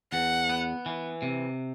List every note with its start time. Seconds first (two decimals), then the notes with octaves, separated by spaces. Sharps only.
0.12 E2 F#5
0.49 B3
0.86 E3
1.22 C3